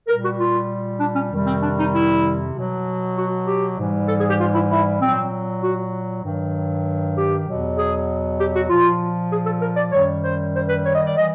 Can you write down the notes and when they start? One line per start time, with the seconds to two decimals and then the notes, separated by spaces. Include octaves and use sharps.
0.08 A#2 G3 A#4
0.24 F#4
0.39 F4
1.00 D4
1.16 C#4
1.32 F2 C3 D#3 G3
1.47 C4
1.62 D4
1.78 D#4
1.93 E4
2.55 B2 F#3
3.16 F#4
3.47 G4
3.77 G#2 E3 G3
4.08 A4
4.18 G#4
4.28 G4
4.39 F4
4.55 E4
4.70 E4
5.01 A#2 F#3 C4
5.62 F#4
6.23 G2 D#3 F#3
7.16 G4
7.46 E2 B2 F#3
7.77 G#4
8.39 G4
8.55 F#4
8.69 A#2 F3 F4
9.32 G#4
9.46 A4
9.62 A#4
9.77 D5
9.92 F#2 D#3 G3 C#5
10.24 C5
10.55 C5
10.69 B4
10.85 C#5
10.95 D#5
11.05 D5
11.16 E3 G3 D#5